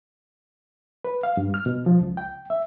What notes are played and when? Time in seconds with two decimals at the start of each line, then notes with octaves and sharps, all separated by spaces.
1.05 B4
1.23 F5
1.37 G2
1.54 F6
1.66 B2
1.86 F3
2.01 C#2
2.17 G5
2.50 E5